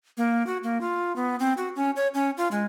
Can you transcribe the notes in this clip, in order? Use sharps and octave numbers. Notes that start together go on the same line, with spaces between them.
A#3
F#4
A#3
F4
B3
C4
F#4
C#4
C#5
C#4
F4
G#3